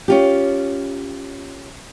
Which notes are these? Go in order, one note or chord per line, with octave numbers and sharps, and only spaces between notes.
C#4 F4 G4